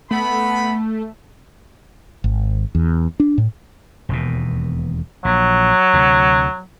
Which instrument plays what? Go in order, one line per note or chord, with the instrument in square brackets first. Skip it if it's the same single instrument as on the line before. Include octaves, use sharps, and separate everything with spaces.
[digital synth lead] A3 [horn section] B3 B5
[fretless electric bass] G#1
E2
D4
A2
[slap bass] E1 D#2 B2
[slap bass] A#1 [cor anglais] F#3
[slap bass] D2 C3